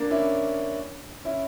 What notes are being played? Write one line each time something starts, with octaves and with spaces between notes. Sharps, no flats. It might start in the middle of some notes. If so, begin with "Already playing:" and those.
Already playing: A#3 D4
C#4 E4
C#4 E4